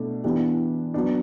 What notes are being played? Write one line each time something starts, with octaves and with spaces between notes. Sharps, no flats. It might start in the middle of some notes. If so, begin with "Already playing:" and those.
Already playing: B2 A3 D4
E3 B3 D4 G4
F#3 B3 D4